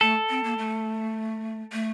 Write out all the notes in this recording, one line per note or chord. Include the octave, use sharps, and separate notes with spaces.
A3 A4
C4
A#3
A3
A3